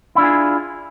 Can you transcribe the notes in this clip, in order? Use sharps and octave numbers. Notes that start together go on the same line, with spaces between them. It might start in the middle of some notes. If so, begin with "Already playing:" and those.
D4 E4 F4 G#4